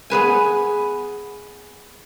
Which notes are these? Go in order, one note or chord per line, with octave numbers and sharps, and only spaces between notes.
B3 G#4 B4 G#5